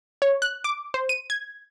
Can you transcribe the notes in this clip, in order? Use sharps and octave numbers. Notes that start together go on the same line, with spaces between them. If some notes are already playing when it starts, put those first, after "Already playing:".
C#5
F#6
D6
C5
D#7
G#6